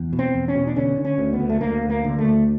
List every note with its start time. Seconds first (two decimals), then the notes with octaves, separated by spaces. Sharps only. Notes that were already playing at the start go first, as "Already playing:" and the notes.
Already playing: E2
0.13 B2
0.19 C4
0.34 E2
0.48 C#4
0.55 B2
0.67 D4
0.76 D3 C#4
0.97 D3
1.05 C#4
1.18 D2
1.33 B3
1.39 D2
1.50 A3
1.61 D2 A#3
1.83 D2
1.90 A#3
2.04 D3
2.18 A3
2.25 D2